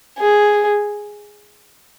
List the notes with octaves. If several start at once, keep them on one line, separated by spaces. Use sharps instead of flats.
G#4